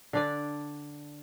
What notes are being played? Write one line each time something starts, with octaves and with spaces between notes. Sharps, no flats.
D3 D4 D5